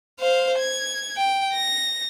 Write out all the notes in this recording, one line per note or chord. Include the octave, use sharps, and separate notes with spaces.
C5 F5
G#6
G5
A#6